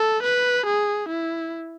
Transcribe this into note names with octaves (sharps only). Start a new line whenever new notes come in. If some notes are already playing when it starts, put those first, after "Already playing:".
Already playing: A4
B4
G#4
E4